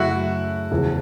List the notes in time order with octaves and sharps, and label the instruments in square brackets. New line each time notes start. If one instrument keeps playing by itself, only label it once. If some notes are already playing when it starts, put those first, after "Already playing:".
Already playing: [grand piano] F#2 C#3 F#3 A3 [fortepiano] E4 F#4
[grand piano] E2 C#3 F3